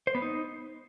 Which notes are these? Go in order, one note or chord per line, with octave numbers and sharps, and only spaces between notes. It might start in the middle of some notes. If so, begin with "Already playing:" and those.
C5
B3
D#4